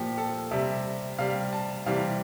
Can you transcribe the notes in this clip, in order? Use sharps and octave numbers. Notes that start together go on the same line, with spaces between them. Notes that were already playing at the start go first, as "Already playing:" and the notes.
Already playing: A#2 F3 G4
A4
C3 G3 E5
C3 G3 F5
A5
C3 E3 G3 F5